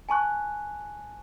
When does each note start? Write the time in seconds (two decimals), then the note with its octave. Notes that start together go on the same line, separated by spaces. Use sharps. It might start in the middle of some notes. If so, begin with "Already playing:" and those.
0.09 G#5 A5 C#6 F#6